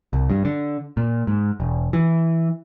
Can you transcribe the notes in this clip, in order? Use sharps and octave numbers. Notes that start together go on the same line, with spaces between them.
C2
G2
D3
A#2
G#2
E1
E3